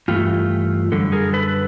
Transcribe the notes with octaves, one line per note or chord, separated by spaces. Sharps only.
G2 E3 A3 F4 G4
F#2 D3 G3 A4
G#4 A#4
A4 B4